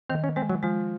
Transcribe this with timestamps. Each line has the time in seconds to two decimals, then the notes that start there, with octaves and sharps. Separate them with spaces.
0.09 D#3 C4
0.24 C#4
0.36 G#3 C4
0.49 F#3
0.63 F3 G#3